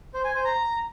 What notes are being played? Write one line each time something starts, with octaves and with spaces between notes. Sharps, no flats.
C5
G#5
C5
A#5